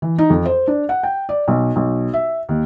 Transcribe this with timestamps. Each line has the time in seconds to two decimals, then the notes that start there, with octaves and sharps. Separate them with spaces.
0.02 E3
0.18 D#4
0.30 F2
0.45 C5
0.68 D4
0.89 F#5
1.03 G5
1.29 D5
1.48 B1
1.76 B1
2.13 E5
2.49 D#2